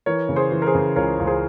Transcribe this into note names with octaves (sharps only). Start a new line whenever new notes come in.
E3 A#4 C#5
C#3
G#4 C5
E3
A#4
G#4 C5
C#3
C#2 A#4 C#5
C#2
G#4 C5